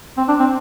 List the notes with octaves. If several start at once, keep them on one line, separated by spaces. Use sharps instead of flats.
C4
D4
C4